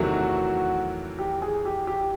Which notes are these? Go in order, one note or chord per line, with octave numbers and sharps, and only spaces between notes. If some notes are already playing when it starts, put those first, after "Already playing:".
Already playing: E2 C3 D#3 F#3 A3 F#4
G4
G#4
G4
G4